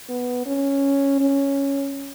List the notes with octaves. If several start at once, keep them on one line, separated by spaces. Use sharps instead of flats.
B3
C#4
C#4